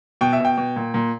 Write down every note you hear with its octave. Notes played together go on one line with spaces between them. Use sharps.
B2 G5
E5
B2 G5
B2
A#2
A#2